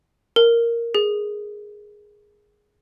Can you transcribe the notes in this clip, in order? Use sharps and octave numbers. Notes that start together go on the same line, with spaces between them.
A#4
G#4